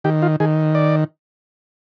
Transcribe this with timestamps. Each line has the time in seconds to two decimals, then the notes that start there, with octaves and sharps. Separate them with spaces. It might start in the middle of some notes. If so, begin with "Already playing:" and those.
0.04 D#3 G4
0.22 F4
0.40 D#3 G#4
0.75 D5